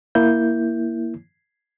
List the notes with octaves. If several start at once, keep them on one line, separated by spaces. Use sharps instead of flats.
A#3 E4 G6